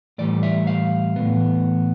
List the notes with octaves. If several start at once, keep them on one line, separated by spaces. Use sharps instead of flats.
A2 E3 G3 D5
E5
F5
A2 E3 B3